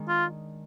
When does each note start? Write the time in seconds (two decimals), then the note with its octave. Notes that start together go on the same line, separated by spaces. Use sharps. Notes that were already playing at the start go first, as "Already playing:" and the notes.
Already playing: D#3 G#3 D4
0.08 F4